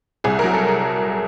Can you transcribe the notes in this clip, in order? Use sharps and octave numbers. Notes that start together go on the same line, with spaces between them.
C2 G#4
F#3 A#4
A4
G#4